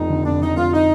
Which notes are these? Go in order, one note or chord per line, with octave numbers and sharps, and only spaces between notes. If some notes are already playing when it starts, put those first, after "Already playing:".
Already playing: F1 F2 D#4
D3
F1 D4
D3 D#4
F2 F4
D#4